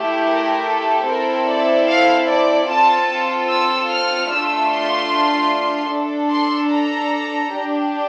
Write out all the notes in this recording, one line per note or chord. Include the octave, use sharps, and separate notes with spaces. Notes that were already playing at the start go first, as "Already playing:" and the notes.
Already playing: A3 E4 G4
A#4
A4
C4 E4 A4 A#4
D5
F5
D5
C4 F4 A4 A5
E6
F6
A3 D4 F4 E6
C6
D4 A4
C6
A#5
D4 G4